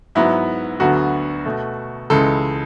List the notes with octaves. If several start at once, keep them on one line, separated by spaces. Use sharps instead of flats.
G#2 F#3 B3 E4
D2 D3 F#3 B3 F#4
B2 A3
C#2 C#3 E3 G#3 A4